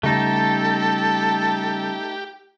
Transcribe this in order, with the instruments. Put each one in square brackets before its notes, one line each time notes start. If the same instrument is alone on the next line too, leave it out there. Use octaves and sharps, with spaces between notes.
[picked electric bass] C#3 G3 [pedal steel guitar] A3 D#4 [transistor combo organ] G4 [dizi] A4